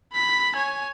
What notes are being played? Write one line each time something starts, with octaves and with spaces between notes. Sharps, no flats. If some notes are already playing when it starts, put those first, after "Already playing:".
B5 B6
C#5 G#5